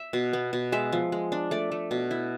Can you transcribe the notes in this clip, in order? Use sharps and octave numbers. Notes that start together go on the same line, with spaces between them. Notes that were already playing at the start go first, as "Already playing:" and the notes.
Already playing: E5
B2
B3
B2
G#3 E5
F3
G#3
D4
A3 D5
A3
B2
E4